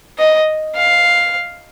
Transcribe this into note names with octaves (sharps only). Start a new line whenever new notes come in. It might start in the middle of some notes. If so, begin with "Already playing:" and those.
D#5
F5